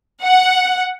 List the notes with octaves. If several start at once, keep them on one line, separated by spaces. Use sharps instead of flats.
F#5